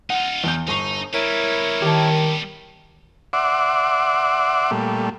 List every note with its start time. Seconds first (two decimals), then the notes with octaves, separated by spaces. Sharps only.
0.10 D#4 F4 F#5
0.44 E2 G6
0.68 G1 D#4 C#6 C7
1.14 G3 B3 E4 A#4 C#5 D7 D#7
1.82 D#3 G4 A5
3.33 D5 E5 F#5 C6 D6
4.71 A#2 G3 A3